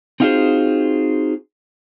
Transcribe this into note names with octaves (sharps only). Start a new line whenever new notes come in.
C4 D#4 F4 F#4 G#4 C5